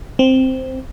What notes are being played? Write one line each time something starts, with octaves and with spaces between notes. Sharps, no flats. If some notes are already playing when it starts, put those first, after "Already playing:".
C4